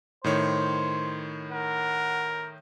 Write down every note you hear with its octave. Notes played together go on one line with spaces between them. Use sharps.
A2 D#3 C5 C#5
A#4 F#5